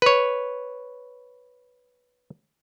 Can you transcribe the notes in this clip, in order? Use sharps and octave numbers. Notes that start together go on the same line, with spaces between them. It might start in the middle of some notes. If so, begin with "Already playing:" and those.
B4 C#5